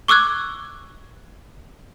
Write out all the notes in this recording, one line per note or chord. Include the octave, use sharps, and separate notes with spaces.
C#6 D6 E6 F#6 G#6